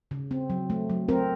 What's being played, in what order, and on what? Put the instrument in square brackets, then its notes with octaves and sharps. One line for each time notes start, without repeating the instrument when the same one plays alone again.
[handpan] C#3
C4
F#3
A3
F#3
C4 A#4